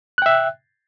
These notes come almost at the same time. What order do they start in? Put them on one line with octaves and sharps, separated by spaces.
F#6 G5 E5